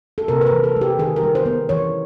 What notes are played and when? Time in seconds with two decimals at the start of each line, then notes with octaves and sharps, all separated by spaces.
0.18 A4
0.28 C3 A#4
0.41 B4
0.46 A#4
0.52 E3
0.64 A4
0.76 A3 G4
0.99 D#3 G#4
1.16 A#4
1.23 G3
1.35 C5
1.46 B3
1.69 E3 C#5